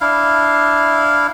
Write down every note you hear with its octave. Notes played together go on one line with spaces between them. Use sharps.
D4 E4 F5